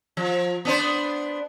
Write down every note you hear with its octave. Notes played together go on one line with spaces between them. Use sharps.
F3
B3 D4 C5